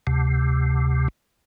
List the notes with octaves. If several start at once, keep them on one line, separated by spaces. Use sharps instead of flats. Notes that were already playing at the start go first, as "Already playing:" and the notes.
D2 C3